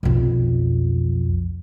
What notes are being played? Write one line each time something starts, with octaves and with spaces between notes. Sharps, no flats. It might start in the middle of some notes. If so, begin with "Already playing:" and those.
B1 F2